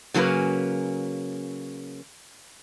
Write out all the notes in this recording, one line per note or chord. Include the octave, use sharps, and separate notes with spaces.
C#3 F#3 A#3 C#4 B4